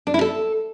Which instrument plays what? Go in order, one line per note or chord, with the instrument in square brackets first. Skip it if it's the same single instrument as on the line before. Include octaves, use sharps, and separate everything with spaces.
[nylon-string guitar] D4
E4
A4